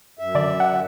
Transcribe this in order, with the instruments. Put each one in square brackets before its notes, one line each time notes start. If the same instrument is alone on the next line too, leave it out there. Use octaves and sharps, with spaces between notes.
[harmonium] F#2 E5
[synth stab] D3 D5
F#5